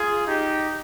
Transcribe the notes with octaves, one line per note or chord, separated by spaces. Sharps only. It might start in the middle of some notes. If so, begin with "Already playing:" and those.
Already playing: F4 G#4
D#4 G4